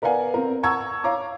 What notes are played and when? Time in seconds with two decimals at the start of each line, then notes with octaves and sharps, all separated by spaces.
0.02 B3 A#4 D5 F5 F#5 G#5
0.34 C4 A#4
0.63 F#5 A5 A#5 C#6 E6 G#6
1.04 C#5 F5 A#5 D6